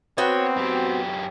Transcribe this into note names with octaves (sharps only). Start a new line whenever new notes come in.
B3 C4 F#4 C#5 G5
F#2 G4